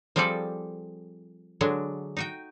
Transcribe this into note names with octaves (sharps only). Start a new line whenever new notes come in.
F3 G3 C4 G#4 A4 D5
D3 F#3 G#3 D4
D#4 F#4 G5